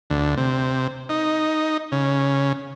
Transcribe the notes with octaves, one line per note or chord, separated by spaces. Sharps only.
D2
C3
D#4
C#3